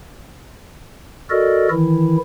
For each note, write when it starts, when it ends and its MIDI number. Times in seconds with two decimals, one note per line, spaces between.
1.30 1.68 66
1.30 1.68 69
1.30 1.68 70
1.30 1.68 74
1.30 1.68 75
1.71 2.17 51
1.71 2.17 52
1.71 2.17 64